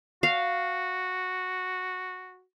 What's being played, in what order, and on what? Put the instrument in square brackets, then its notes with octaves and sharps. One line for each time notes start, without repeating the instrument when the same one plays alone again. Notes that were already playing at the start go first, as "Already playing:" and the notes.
[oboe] F#4 [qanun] F5